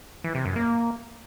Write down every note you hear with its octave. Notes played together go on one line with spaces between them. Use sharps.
E3
C3
F#2
A#3